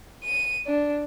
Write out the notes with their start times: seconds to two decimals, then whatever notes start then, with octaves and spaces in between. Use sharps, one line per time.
0.24 D#7
0.66 D4